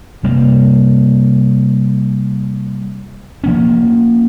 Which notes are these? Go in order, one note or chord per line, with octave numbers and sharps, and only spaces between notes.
C3 G3 A#3
F3 A#3 C#4